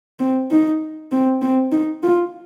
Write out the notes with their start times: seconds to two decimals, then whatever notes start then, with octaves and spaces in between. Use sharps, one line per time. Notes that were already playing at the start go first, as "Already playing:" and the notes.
0.19 C4
0.51 D#4
1.12 C4
1.42 C4
1.72 D#4
2.03 F4